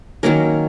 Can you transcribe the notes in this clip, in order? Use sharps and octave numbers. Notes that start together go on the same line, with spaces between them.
D#3 F#3 A#3 C#4 A#4